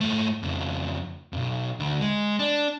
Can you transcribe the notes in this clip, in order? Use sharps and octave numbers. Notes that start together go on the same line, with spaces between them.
G#2 A3
F2 C#3
B1 F2
D2
G#3
D4